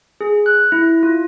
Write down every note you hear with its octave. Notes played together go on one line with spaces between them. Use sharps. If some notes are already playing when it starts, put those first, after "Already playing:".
G#4
F#6
E4
F4